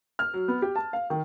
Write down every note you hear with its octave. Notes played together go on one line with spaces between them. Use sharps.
F6
F#3
B3
G4
A5
F5
D#3